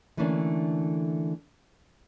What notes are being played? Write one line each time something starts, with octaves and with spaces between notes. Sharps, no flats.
D3 E3 A3 A#3 C#4 D4